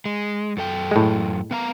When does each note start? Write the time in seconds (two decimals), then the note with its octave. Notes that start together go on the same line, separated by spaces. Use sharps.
0.05 G#3
0.57 F#2 A4 G5
0.91 A2 G#3
1.51 B3 F5 A#5